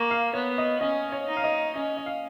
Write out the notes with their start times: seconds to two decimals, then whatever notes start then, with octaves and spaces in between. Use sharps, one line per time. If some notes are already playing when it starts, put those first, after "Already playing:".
Already playing: A#3 C#6
0.11 F5
0.34 B3 C#5
0.58 D#5
0.81 C#4 D#5
1.12 C#5
1.28 D#4
1.37 F5
1.44 D#5
1.76 C#4 D#5
1.97 D#5
2.06 F5